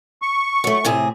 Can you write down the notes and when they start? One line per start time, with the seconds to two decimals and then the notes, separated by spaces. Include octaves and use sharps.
0.22 C#6
0.64 F#3 A3
0.85 A2 C3 G#4